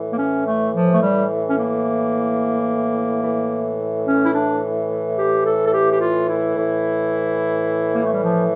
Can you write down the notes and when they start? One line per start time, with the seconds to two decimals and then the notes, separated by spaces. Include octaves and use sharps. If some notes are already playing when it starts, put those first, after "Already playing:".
Already playing: A2 E3
0.13 A#3
0.19 C#4
0.46 A3
0.74 F3
0.93 A3
1.01 G3
1.48 C#4
1.57 A#3
3.23 A2 E3
4.06 C#4
4.26 E4
4.34 D4
5.17 G4
5.45 A4
5.65 A4
5.72 G4
5.92 G4
6.00 F4
6.28 E4
6.56 A2 E3
7.94 A#3
8.04 A3
8.13 G3
8.22 F3